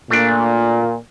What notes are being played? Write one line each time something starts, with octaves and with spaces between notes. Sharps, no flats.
A#2 A3 D4